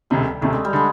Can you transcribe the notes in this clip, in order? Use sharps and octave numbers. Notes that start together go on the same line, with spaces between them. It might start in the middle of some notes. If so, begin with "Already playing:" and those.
E1 D2 C3 G3
E1 D2 C3 A3
G#3
G3
D3 G#3